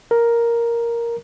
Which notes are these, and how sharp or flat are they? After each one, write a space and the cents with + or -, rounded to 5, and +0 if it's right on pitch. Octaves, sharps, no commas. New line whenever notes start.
A#4 +5